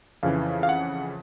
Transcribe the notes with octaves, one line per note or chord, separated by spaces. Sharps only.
F2 C#3 E3 F5
F5
F#5